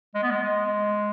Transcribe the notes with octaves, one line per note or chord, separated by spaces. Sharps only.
G#3
B3
G#3
G#3